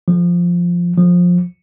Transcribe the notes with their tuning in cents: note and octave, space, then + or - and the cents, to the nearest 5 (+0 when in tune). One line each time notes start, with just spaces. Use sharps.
F3 +0
F3 +20